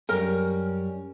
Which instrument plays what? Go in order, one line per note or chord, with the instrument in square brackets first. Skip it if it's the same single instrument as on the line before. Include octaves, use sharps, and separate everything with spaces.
[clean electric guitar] F#2 G3 C#4 [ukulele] A#4